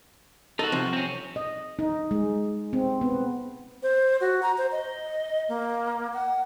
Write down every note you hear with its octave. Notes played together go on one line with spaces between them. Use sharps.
D#4 F#4 A4
C3 F3
C4 C#4
D#5
D#4
G#3
C4
B3
C5
F#4
A#5
C5
D#5
A#3
F#5